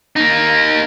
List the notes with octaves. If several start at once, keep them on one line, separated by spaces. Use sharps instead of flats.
A#3 D#4